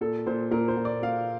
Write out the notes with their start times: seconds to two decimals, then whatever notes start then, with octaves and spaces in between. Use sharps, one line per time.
0.01 A#2 A4
0.26 A#2 C5
0.51 A#2 A#4
0.68 C5
0.77 A#2
0.85 D5
1.02 A#2 F5